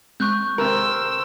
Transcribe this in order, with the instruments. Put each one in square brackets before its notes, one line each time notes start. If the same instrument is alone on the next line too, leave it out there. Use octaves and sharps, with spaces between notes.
[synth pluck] G#3 C4 [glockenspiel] C#6 F#6 G6
[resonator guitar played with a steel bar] C3 A#4 [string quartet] C5 E6